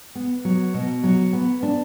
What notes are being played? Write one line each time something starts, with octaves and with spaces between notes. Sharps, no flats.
B3
F#3
B2
F#3
B3
D4